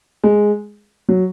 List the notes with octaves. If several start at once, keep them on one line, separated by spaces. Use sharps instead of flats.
G#3
F#3